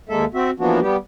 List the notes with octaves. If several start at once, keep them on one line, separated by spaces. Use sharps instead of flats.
D#2 G#3 A#3 A4 E5
C4 F#4 E5
E3 F3 A#3 B3 D4 F#4
G3 B3 G4